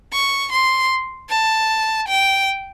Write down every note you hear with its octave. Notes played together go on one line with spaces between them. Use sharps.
C#6
C6
A5
G5